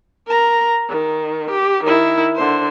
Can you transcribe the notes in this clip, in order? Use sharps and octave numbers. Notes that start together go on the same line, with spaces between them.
A#4 A#5
D#3
G4
D#3 E4
D3 C5